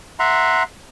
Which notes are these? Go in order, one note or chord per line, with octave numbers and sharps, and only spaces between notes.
E5 F#5 A#5 C6